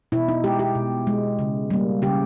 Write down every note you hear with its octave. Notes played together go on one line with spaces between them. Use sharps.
B2 E4
D#4
G#3 G4
G4
B2
G#3
C#3
G3 A#3
C#3 G4